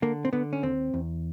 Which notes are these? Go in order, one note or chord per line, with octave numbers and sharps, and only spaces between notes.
D3 A#3
C4
D3 B3
C#4
D#2 C4
E2